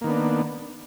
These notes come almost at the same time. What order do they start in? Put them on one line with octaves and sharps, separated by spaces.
A#3 D#3 B3 D4